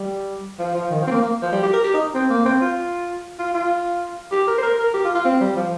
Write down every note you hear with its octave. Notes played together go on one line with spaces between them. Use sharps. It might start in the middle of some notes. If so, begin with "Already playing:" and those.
Already playing: G3
F3
F3
D#3
F3
C4
A#3
A#3
F3
G3
G4
A#4
G4
D#4
C4
A#3
C4
F4
F4
F4
G4
A#4
C5
A#4
A#4
G4
F4
F4
C4
G3
F3